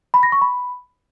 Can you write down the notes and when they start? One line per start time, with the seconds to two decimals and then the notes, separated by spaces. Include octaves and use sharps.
0.14 B5
0.23 A#6
0.32 C#6
0.42 B5